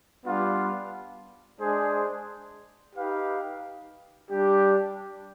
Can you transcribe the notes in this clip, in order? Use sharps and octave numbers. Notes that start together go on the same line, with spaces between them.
G3 B3 D4 F4
G#3 D4 G#4 C5
D#4 G4 B4 F5
G3 D4 G4